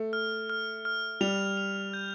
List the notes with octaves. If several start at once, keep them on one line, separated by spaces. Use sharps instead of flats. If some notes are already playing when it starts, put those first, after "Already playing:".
Already playing: A3
F6
F6
F6
G3 F7
F7
G6